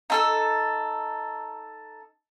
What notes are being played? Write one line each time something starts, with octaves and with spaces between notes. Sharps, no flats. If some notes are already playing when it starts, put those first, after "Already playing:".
D#4 A4 E6